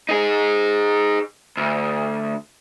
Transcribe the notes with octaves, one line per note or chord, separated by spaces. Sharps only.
D#4 G#4
D2